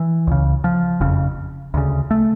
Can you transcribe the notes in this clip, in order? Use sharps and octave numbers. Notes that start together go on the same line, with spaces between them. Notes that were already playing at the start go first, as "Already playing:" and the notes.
Already playing: E3
C#2 C#3
F3
F#1 F2 C#3
D2 C#3
A3